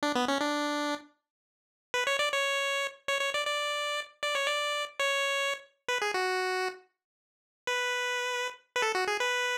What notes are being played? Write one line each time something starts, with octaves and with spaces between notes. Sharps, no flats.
D4
B3
C#4
D4
B4
C#5
D5
C#5
C#5
C#5
D5
D5
D5
C#5
D5
C#5
B4
G#4
F#4
B4
B4
A4
F#4
G#4
B4